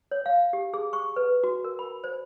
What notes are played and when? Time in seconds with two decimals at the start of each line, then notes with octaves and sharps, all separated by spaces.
0.11 C#5
0.26 F5
0.53 G4
0.74 G#4
0.93 C#6
1.16 B4
1.44 F#4
1.64 A#4
1.79 B5
2.04 C5